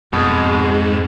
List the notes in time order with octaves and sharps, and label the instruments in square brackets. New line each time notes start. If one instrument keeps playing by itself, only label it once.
[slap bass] F2 [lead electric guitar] G#2 [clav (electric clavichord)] B2 [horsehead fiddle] G#3